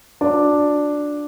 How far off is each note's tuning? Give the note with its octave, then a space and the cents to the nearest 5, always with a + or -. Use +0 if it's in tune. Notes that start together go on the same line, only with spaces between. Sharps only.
D4 +0 F#4 -40